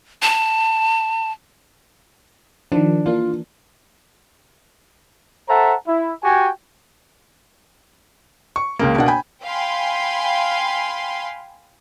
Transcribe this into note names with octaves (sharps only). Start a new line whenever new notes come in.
A5
D#3 F3 D4
E3 A#3 D4 F4
A4 C5 E5 F#5 A5 A#5
E4
F#4 G4 G5 G#5
C#6
C#2 C#3 A#3
B2 A#3 D4 F#5
G5 G#5 B5
F5 G5 G#5 B5 C6